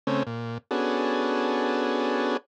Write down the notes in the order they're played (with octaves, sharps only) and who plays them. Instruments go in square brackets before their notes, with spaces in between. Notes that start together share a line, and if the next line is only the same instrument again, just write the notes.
[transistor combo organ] C#3 A3 C4 C#4
A#2
B3 C#4 D4 F#4 G#4 A4